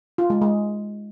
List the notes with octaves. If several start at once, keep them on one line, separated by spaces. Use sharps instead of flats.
F4
G#3
G#3